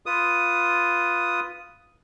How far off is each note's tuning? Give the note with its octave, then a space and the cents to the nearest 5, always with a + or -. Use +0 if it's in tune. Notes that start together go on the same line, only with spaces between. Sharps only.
F4 +0 B4 +0 D#6 +0